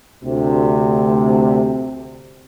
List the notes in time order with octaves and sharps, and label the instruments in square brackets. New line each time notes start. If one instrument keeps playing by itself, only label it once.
[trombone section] D2 C3